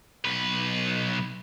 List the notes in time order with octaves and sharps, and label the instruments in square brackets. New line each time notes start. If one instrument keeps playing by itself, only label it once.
[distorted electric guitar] B1 B4